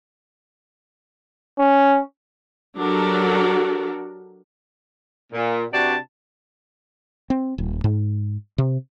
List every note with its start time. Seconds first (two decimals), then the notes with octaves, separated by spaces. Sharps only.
1.59 C#4
2.78 F#3 D4 F#4 G4 A4 A#4
5.33 A#2
5.72 C3 D4 F#4 B4 D5 A5
7.30 C4
7.58 D#1
7.84 G#2
8.58 C3